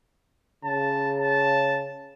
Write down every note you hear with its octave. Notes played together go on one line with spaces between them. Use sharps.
C#3 A5
A5